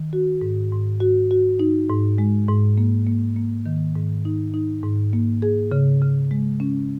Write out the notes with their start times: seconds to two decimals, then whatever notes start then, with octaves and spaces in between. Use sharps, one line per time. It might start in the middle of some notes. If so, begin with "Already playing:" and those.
Already playing: D#3
0.13 F#4
0.41 G#2
0.72 G#2
1.00 F#4
1.31 F#4
1.60 D#4
1.89 G#2
2.18 G#3
2.49 G#2
2.78 A#3
3.07 A#3
3.36 A#3
3.66 D#3
3.95 G#2
4.25 D#4
4.54 D#4
4.83 G#2
5.13 A#3
5.42 G#4
5.72 C#3
6.02 C#3
6.31 G#3
6.60 C#4